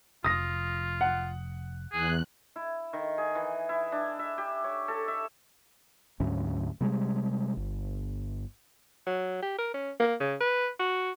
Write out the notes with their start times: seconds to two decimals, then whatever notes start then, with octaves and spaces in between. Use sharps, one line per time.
0.24 F1 F4 D#6 A#6
1.01 F#5
1.93 E2 G#4 F#6
2.56 E4
2.93 D#3
3.18 G#4
3.35 E3
3.69 E4
3.92 D4
4.19 E5
4.38 G4
4.64 C#5
4.88 A4
5.08 E5
6.20 D2 G#2 F#3 C#4
6.81 C3 G3 G#3
7.57 G1
9.07 F#3
9.43 G4
9.59 A#4
9.74 C#4
10.00 A#3
10.20 C#3
10.40 B4
10.79 F#4